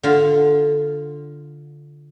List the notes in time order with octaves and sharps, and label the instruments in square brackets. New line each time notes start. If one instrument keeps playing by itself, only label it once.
[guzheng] D3 F4